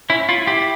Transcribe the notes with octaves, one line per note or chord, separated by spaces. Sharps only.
C#4 E4
E4 F4
E4 G4